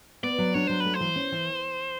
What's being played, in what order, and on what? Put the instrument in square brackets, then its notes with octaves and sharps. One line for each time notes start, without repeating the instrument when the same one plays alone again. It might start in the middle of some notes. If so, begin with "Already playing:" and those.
[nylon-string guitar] B3 [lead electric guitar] D5
[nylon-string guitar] F#3
[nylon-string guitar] D4 [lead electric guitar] C#5
[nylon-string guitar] F#3 [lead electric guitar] C5
[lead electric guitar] B4
[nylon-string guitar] A3
[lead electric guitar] C5
[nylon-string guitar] E3
C#4
E3